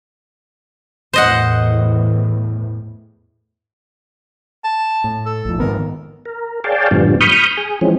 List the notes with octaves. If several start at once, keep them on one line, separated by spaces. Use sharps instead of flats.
E2 A2 C5 D#5 F#5
A5
A2
A4
A#1 F2
G#2 D#3 B3 A#4
A#4
G#4 C#5 D5 F5 G5 A5
F#2 A2 D3 F3 G3 B3
B5 C#6 D#6 F6 G6
G#4
E3 F3 G#3 C4 C#4